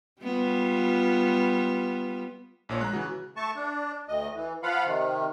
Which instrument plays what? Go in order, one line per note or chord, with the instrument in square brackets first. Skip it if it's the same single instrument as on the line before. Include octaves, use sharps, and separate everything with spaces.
[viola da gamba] G3 B3 F4
[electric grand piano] A#1 A#2 C#5
[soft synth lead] G#3 [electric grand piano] A#5 F#6
[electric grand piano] C#3 E3 [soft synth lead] F#4
[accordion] A3 A5 C#6
D4
D2 D#5
E3
F3 F4 F5 F#5 B5
C3 D#3